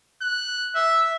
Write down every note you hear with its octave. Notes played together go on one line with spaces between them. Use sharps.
F#6
E5